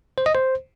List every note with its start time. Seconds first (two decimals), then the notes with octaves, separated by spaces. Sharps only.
0.18 C5
0.26 D#5
0.35 C5